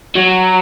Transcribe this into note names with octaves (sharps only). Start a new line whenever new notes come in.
F#3